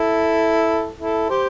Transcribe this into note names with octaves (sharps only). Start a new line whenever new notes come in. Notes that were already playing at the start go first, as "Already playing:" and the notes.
Already playing: E4 A4
E4 A4
G4 C5